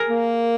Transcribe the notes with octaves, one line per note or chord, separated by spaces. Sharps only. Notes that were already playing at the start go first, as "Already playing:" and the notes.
Already playing: G#4 A#4
A#3